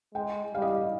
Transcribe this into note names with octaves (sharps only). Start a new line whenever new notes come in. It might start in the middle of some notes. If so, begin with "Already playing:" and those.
G#3 G5
G3 F5
D#5
F5